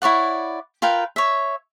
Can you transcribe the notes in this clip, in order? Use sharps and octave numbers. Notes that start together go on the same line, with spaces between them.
E4 C#5 D5 F#5
F4 A#4 B4 G5
C#5 E5